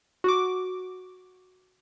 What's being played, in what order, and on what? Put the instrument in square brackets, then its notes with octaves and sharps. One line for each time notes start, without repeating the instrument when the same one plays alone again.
[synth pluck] F#4 D6